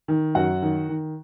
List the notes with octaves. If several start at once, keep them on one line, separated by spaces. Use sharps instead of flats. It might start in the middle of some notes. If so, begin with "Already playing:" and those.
D#3
F#2 F#4 F#5
D#3
D#3